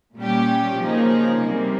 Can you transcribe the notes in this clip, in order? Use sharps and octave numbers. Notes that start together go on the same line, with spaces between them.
A#2 G3 C#4 G4
C#3 F3 A#3 D#4 G#4
C3 G3 A#3